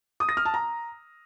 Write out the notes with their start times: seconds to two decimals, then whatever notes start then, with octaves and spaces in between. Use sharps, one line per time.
0.20 D#6
0.29 A#6
0.37 F6
0.45 A5
0.54 A#5